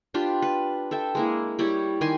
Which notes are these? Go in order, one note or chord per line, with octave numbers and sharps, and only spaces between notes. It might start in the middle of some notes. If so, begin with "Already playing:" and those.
D4 F4 G4 B4
B4
A4 E5 G5
G#3 A#3 E4
G3 E4 G4 C#5
D#3 G4 G#5 C6